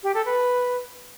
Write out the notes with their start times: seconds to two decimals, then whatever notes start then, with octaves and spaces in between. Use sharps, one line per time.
0.03 G4
0.14 A4
0.26 B4